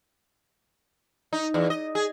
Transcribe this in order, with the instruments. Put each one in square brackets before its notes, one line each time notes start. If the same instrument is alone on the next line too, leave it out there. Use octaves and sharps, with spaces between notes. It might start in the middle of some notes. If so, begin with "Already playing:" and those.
[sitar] D#4
E2
D#5
G#4